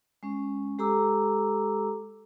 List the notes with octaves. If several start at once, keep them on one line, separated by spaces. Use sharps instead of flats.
G#3 C#4
G#3 G4 A4 A#5 D6 E6